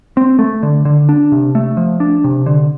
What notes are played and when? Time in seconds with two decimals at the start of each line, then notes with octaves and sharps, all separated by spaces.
0.17 C4
0.39 A3
0.63 D3
0.85 D3
1.09 D4
1.32 C3
1.55 A3
1.77 F3
2.00 D4
2.24 C3
2.46 D3